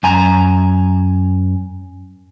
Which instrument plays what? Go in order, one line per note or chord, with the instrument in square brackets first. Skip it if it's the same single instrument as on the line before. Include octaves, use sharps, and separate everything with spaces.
[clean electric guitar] F#2 G#5 A#5